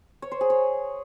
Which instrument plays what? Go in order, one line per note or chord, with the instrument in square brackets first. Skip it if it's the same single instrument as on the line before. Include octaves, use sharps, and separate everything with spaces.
[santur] C#5
C5
G#4
C#5